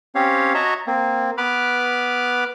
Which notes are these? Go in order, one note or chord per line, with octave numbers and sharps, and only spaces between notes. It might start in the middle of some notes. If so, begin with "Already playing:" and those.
C4 C#4 G4 C#5 F5
F#4 C#5 D#5 E5 A5 A#5
A#3 C4
B3 B4 B5 D6 F6